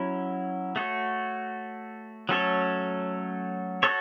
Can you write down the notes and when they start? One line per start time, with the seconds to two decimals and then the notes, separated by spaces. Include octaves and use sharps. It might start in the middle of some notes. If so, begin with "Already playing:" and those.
Already playing: F#3 C#4 E4
0.76 A3 F#4 C#5
2.29 F#3 A3 C#4 A4 C#5
3.83 F#4 A4 C#5